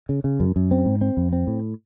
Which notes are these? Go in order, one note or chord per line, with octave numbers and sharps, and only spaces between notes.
C#3
C#3
F#2
F#2
C4
G#2
C4
F2
C4
A2